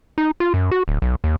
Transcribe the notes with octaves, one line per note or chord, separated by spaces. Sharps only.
D#4
F4
F#2
F#4
D1
B1
D#2